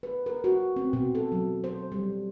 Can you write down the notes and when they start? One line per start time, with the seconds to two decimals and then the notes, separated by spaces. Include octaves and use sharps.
0.03 B4
0.26 A#4
0.44 F#4
0.76 C4
0.93 B2
1.15 A4
1.32 F#3
1.64 C5
1.92 G3